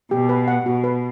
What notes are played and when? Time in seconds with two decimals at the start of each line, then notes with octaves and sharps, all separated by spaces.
0.11 B2 G4
0.29 B4
0.48 F#5
0.66 B2 F#4
0.84 B4